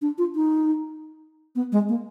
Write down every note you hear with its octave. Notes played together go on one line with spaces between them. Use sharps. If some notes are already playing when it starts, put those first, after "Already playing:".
D4
F4
D#4
B3
G#3
A#3